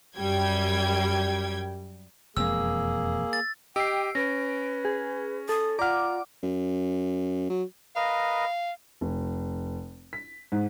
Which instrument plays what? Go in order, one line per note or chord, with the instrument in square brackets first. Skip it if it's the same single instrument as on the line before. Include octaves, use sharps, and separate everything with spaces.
[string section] F#2 G3 G5 G#6
[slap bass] E1 F2 G#3 [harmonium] A#3 G#4 [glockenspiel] E6
[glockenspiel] A6
[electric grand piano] G4 D#5 [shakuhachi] G5 [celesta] E6 C7 [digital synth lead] D7
[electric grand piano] C#4 [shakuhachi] B4 [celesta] A#6
[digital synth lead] G#4
[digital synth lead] A4 [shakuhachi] D#6
[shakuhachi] F4 [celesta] D5 F#5 [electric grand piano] A#5 F6 [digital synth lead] D6
[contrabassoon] F#2
F#3
[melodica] A#4 B4 D#5 [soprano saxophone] F5
[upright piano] F1
B6
G#2